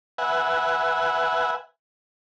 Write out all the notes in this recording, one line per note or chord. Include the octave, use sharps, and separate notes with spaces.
B4 E5 F#5 G#5